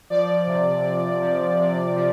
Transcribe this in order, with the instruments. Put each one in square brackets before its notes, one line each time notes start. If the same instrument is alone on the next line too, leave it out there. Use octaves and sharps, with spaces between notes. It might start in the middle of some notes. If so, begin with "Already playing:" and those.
[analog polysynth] F3 D5
C3
C3
F3
C3
F3